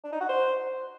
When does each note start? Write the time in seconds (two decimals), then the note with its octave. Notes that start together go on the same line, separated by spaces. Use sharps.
0.04 D4
0.12 D#4
0.21 F#4
0.29 C5